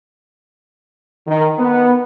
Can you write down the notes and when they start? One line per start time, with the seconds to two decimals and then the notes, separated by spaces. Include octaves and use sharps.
1.27 D#3
1.59 B3